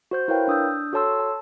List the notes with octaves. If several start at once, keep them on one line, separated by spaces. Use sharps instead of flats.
F#4 C5 G6
E4 A#4 B4 C#5 F5 G5
D4 D#6 E6 G6
F#4 A4 C#5 A5 C6 E6
A5